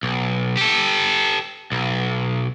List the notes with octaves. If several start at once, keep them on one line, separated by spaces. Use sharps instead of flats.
B1
G4 A4
B1